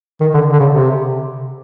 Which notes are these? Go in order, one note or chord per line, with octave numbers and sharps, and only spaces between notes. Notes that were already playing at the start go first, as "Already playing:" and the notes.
D#3
D3
D3
C#3
C3